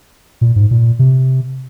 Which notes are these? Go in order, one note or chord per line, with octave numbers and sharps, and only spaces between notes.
A#2
G#2
A#2
C3